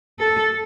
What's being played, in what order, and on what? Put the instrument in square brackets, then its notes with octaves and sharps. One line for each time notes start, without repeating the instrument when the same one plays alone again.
[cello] A4